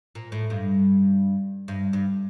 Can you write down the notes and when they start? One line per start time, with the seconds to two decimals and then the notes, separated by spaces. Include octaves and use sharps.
0.15 A#2
0.32 A2
0.50 G2
1.68 G2
1.93 G2